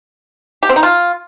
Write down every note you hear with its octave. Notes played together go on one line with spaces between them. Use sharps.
G4
C4
D#4
F4